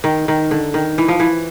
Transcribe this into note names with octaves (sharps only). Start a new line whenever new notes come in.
D#3
D#3
D3
D#3
E3
F3
E3